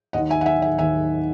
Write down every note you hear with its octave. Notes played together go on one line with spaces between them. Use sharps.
D#2 D#3 D#5 F#5
E5 G#5
F#5
E5 G#5
E5 G#5
D#2 D#3 E5 G#5